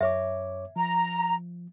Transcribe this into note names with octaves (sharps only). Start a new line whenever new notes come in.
F#2 C#5 E5 D6
F3 A#5